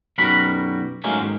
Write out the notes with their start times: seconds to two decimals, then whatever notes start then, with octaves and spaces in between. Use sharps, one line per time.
0.18 B1 F#2 G3 F#4 A#4 B5
1.04 A2 F#3 G#3 A#3 C#4 D#4
1.20 G#2 D#3